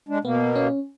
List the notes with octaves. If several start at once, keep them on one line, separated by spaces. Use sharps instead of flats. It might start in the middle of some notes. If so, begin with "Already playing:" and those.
G#3 D4
B2 A#3 B3
C#4